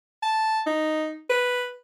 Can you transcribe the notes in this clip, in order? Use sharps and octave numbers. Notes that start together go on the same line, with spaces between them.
A5
D#4
B4